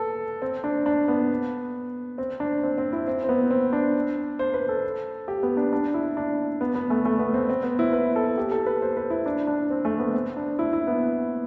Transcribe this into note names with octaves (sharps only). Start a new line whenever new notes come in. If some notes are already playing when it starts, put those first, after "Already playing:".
Already playing: A4 B4
C4
D4
D4
B3
C4
D4
C4
C4
E4
C4
C4
B3
C4
D4
C5
B4
A4
G4
B3
D4
D4
E4
D4
B3
B3
A3
A3
B3
C4
C4
B3
E4
B4
A4
G4
A4
B4
C5
B4
E4
D4
D4
C4
A3
B3
C4
D4
E4
E4
B3